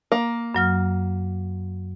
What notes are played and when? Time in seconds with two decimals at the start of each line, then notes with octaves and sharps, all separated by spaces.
0.12 A#3
0.55 F#2 F#3 F6